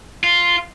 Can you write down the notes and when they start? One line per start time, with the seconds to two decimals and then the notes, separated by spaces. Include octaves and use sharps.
0.24 F4